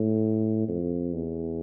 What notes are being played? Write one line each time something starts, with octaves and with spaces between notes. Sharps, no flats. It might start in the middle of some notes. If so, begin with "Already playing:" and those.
Already playing: A2
F2
E2